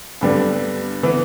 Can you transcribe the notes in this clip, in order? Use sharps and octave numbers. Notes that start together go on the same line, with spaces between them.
G2 D3 G3 B3 D4
E3 B3